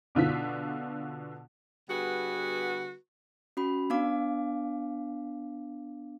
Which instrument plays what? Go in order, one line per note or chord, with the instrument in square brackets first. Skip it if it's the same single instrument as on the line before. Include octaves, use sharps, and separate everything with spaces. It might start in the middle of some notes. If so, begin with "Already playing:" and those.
[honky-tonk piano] B2 D3 F4 B6
[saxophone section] D3 G3 B3 F#4 G#4 B4
[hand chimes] C#4 F#4 B5
B3 D4 F5 D6